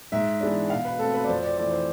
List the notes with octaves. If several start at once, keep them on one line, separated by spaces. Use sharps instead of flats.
G#2 E5
E3 G#3 B3 D4
B2 F5
B4
A3 C4 A4
B4
D5
F2 C5
D5
E3 A3 D5
C5